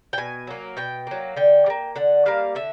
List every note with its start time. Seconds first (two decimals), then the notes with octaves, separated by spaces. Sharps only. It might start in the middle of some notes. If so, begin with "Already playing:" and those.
0.13 G5
0.18 B2 G#5
0.47 F#3 A#3
0.77 B2 G5
1.07 F#3 A#3
1.36 D3 G5
1.66 G3
1.70 A#3
1.96 D3 F#5
2.26 G3 A#3 F5
2.55 D3 E5